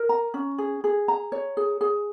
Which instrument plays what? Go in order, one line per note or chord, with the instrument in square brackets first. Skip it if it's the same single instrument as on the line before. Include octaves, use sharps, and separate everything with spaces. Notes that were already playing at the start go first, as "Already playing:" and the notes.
Already playing: [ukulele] A#4
A#5
C#4
G#4
G#4
A#5
C#5
G#4
G#4